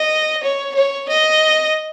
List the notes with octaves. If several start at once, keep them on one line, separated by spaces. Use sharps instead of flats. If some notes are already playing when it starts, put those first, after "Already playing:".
Already playing: D#5
C#5
C#5
D#5